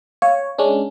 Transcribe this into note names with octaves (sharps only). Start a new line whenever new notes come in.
C#5 F5
G#3 C#4 D4